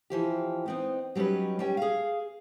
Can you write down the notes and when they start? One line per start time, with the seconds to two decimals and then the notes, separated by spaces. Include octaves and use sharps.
0.10 E3 F3 G4
0.66 B3 C4 D#4
1.15 F#3 G3 C#4 D#4 B4
1.59 G3 C#4 G5
1.77 G#4 F5